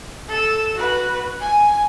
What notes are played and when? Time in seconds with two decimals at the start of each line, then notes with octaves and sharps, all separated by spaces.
0.28 A4 E6
0.75 F#4 B4
1.40 G#5